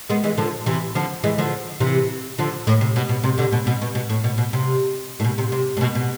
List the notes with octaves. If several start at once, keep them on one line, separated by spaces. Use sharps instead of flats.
G#3 B3
E3 G#3
D3 F3
C3 E3
D3 F3
E3 G#3
D3 F3
C3 E3
D3 F3
A2
C3
B2
B2
C3
B2 D3
B2
B2
B2
B2
A2
B2
B2
C3
A2
B2
C3
C3
A2
B2
B2